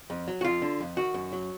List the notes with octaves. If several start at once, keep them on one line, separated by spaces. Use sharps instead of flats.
F2
F#3
F#4
F2 F4
D3
F2
D#3 F#4
F#2
F#3